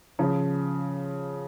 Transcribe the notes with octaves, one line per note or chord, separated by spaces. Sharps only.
C#3 F3